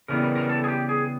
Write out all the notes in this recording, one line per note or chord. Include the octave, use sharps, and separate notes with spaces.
C#3 E3 G3 B3 A#4
A#4
A#4
A4
G#4
G4
G#4